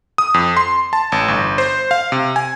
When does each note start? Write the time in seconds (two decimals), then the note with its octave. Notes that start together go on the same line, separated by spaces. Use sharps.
0.18 D#6
0.34 F2
0.57 C6
0.93 A5
1.12 A1
1.28 G1
1.58 C5
1.91 F5
2.12 C3
2.36 G#5